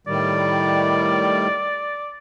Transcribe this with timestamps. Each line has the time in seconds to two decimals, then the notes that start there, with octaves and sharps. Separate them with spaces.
0.07 A2 D#3 G3 D5